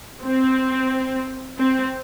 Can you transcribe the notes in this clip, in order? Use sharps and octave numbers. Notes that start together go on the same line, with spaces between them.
C4
C4